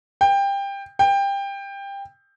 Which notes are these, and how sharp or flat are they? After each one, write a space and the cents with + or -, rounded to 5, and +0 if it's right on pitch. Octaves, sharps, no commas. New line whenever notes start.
G5 +20
G5 +20